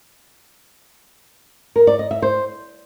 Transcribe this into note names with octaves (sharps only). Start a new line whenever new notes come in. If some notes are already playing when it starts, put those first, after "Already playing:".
A#4
D5
D#5
E5
C5